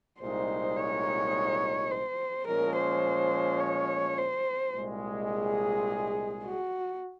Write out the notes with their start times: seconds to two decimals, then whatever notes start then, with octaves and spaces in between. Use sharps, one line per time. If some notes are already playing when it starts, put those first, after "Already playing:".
0.20 C2 A#2 G#3 D#4 C5
0.76 C#5
1.91 C5
2.47 A#2 F3 G#3 C#4 A#4
2.76 C5
3.60 C#5
4.18 C5
4.74 C2 A#2 G#3
5.31 G#4
6.45 F#4